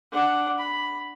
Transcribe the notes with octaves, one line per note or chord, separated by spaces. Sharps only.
D4 F#5
B5